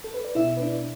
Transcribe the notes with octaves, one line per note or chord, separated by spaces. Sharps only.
A4
B4
D5
B2 B3 E4 E5
B4
D4 D5